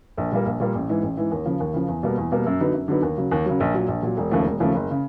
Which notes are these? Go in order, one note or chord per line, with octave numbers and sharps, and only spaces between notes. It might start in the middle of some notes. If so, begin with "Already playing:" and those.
A#1
A#2 G3 A#3
A#1
A#2 G3 A#3
A1
G#2 E3
A1
G#2 E3
D#2
C#3 F3
D#2
C#3 F3
E2
B2 G3 A#3
E2
B2 G3 A#3
F#2
D3 F#3 B3 D#4
F#2
D3 F#3 B3 D#4
D#2
C#3 F#3
D#2
C#3 F#3
A#1
A#2 F#3
A#1
A#2 F#3
E1
D#2 C#3 F3 A3
E1
D#2 C#3 F3 A3
F#1
C#3